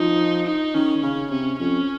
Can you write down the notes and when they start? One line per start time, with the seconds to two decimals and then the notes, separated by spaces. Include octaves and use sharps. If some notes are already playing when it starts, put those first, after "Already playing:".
Already playing: F3 D#4
0.47 D#4
0.75 D#3 C#4
1.03 C#3
1.31 C3 C#4
1.59 F2 C#4